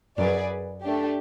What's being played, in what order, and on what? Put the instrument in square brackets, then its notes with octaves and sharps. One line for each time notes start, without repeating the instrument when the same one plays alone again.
[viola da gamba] F#2 [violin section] G#4 B4 D5
[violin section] A3 D4 G4